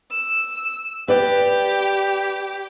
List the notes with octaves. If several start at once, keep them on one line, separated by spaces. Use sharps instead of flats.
E6
G4 B4 D5